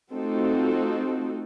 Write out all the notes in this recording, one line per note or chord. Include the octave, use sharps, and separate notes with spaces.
A3 C4 D#4 F4 F#4 A4